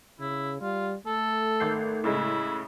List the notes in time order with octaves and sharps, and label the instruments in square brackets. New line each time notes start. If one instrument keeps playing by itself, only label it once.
[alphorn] C#3 [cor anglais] E4
[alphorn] G3 [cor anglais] F4
[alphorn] A3 [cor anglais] A4
[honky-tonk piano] G#1 G6 C7
[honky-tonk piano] A2 C#3 G#3 [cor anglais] E4